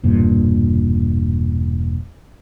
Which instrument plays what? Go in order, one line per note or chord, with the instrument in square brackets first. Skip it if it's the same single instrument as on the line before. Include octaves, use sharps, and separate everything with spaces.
[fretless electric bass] E1 G2 A#2